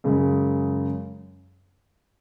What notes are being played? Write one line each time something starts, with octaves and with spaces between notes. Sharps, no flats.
F#2 C#3 G#3